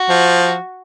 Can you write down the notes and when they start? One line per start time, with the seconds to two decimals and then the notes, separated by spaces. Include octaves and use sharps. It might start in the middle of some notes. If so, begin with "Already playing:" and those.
Already playing: F#4
0.09 F3